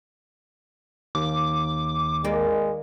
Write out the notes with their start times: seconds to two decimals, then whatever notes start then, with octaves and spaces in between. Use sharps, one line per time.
1.15 D#2 D6
2.24 D#3 G#3 A#3 D5